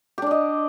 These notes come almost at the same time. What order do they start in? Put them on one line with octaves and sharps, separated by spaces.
G4 D4 D5 D#5